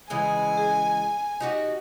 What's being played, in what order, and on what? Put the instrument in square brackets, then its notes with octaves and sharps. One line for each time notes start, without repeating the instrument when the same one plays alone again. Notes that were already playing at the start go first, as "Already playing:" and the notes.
[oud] C#3 E3 G#3 [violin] G#5
[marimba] G#4
[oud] D#4 F#4 G4